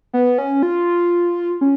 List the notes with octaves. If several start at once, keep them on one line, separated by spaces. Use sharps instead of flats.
B3
C#4
F4
C#4